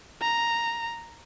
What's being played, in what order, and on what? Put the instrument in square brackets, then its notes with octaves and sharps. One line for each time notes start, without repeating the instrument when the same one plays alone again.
[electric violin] A#5